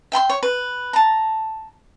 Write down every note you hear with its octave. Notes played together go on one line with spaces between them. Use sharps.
E5 G5 B5 C6
C#5
B4
A5 A#5